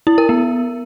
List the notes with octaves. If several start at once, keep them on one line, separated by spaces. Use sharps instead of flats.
E4
A#4
B3